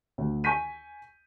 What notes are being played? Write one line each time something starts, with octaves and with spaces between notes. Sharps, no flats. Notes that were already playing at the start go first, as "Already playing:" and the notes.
D2
G#5 C#6 G6 B6 D#7